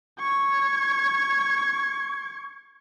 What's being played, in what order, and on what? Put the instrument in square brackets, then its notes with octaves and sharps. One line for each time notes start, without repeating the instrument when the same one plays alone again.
[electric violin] C#6 G#6